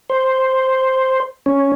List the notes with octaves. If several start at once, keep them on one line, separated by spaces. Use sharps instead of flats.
C5
C#4